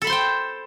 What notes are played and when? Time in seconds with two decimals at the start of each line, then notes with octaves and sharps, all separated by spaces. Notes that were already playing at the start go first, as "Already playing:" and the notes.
0.02 A4
0.04 B5
0.07 C6
0.10 C5
0.12 G5